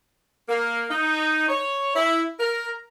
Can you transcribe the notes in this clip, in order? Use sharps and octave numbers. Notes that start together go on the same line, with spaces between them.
A#3
D#4
C#5
E4
A#4